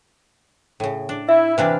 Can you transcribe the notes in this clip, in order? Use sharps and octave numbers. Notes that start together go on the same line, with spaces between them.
A2 C#3
D4
E4 E5
C3 E3 D4 B4 F5